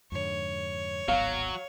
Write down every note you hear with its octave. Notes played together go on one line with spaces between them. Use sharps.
F2 G#2 D3 C#5
D1 G#1 F#3 B3 F5